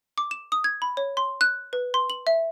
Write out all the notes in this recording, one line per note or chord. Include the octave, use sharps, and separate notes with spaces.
D6
E7
D#6
G#6
B5
C#5
C6
F#6
B4
C6
F#7
E5